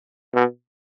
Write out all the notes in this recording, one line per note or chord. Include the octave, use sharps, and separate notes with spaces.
B2